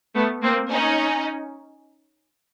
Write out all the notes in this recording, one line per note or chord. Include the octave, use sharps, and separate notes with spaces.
A3 B3
A#3 C4
C#4 D#4